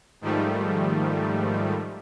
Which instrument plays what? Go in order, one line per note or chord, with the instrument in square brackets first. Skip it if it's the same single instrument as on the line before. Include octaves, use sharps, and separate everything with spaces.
[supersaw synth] G#2 D#3 F3 G3 A3